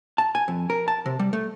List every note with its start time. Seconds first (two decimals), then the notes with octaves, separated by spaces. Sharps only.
0.18 A5
0.35 G#5
0.48 F2
0.70 A#4
0.88 A5
1.06 C3
1.19 G3
1.33 A3